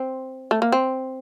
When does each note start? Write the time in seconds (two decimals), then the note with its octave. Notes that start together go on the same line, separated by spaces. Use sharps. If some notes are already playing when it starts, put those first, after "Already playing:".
Already playing: C4
0.51 A3
0.62 A#3
0.72 C4